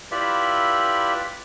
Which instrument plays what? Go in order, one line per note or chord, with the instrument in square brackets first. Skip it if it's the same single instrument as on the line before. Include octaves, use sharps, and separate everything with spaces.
[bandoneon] E4 F4 G4 B4 D5 E5